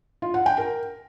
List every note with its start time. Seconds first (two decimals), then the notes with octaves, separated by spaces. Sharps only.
0.22 F4
0.34 F#5
0.46 G5
0.58 A#4